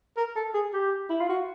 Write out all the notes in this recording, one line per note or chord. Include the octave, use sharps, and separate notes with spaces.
A#4
A4
G#4
G4
E4
F4
F#4